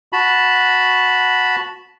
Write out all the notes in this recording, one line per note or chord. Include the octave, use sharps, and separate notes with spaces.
F#4 A5 B5